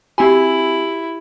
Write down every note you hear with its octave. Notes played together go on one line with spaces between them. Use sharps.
C4 E4 F#4 G4 G#5